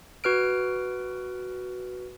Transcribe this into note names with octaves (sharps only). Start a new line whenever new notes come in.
F#4 B4 F6 D7